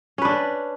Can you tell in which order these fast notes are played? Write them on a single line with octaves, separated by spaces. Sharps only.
C#4 B4 D4